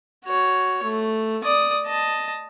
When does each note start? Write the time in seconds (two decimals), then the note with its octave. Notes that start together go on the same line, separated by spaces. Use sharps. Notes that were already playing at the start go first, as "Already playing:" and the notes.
0.25 F#4 C#5
0.83 A3
1.44 D5 D#6
1.85 D#5 A5